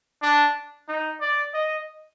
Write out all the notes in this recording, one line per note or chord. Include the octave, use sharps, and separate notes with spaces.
D4
D#4
D5
D#5